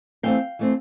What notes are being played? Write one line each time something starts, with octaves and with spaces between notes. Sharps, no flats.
E3 A3 C4 F5 G5
E3 A3 C4